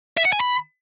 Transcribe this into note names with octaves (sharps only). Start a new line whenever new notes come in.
E5
F#5
G#5
B5